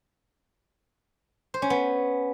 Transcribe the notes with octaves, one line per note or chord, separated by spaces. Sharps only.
C5
C#4
B3